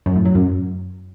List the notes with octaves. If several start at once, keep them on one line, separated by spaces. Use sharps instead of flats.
F#2
A2
F#3
F#2